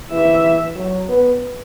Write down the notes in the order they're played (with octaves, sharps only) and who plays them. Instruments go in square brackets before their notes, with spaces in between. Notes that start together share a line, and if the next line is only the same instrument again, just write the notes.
[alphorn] E3 [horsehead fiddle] E5
[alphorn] F#3
B3